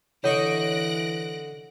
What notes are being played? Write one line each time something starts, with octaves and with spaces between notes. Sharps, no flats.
D3 E3 C#5 D#5 C#6 F#6 A#6 D7